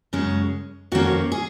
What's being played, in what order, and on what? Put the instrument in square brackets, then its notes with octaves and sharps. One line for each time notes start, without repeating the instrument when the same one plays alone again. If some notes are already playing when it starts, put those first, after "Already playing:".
[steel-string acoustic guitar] F#2 C#3 G#3 C#4
F2 D#3 A#3 C#4 F#4
G#4